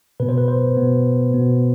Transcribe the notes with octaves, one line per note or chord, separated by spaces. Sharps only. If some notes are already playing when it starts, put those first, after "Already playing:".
B2 B3 B4
C5
B4
C5
B2 B3
B2 B3